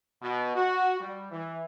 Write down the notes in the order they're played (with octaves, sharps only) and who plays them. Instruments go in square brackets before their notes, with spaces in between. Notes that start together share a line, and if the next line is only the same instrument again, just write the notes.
[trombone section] B2
F#4
G3
E3